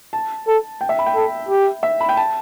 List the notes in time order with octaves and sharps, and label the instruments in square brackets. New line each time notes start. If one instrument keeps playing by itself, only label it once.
[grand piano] A5
[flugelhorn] A4
[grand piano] G5
E5
B5
G5
[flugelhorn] A4
G4
[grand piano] E5
B5
G5
A5